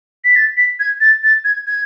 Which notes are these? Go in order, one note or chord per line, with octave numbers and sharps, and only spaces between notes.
B6
A6
B6
G#6
A6
A6
G#6
G#6